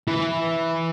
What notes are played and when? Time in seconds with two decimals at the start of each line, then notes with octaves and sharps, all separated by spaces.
0.08 E3